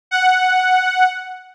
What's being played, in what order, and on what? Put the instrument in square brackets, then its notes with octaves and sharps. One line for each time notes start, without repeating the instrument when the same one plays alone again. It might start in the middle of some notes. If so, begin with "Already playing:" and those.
[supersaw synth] F#5